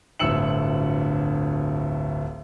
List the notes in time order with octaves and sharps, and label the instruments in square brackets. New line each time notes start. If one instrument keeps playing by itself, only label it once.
[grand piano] D1 G1 D2 E6 C#7 F#7